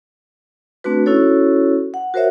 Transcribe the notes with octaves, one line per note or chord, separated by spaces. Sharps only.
A3 C4 D4 F#4 B4
C#4 E4 F#4 A4 C#5
F#5
F#4 A#4 C5 C#5 E5 F#5